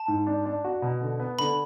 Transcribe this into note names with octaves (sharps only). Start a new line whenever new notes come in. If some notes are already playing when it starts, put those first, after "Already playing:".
Already playing: A5
G#2
D4
D4
F#4
B2
D3
B3
D3 B5